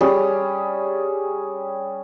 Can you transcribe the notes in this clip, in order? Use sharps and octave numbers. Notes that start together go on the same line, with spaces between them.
G3 C#4 G#4